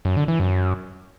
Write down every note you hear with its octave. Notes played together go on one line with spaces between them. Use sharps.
F#2
D3
E3
F#2